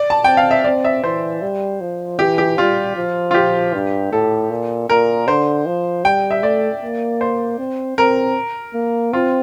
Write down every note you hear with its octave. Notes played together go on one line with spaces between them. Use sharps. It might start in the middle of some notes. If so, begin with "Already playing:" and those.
Already playing: D5
A5
C4 G5
F5
E5
C4 D5
E5
E3 C5
G3
F3
E3 G4
G4
G3 F4
F3
F4
G4
G2
A2 A4
A#2
A#2 A#4
D3 C5
F3
G3 G5
E5
A3 D5
A#3
C5
C4
C4 A#4
A#3
C4 F4